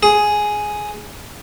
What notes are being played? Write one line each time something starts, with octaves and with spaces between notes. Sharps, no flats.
G#4